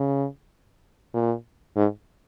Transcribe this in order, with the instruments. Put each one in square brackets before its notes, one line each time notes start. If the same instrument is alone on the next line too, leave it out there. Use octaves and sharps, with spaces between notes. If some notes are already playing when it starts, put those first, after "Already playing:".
Already playing: [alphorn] C#3
A#2
G#2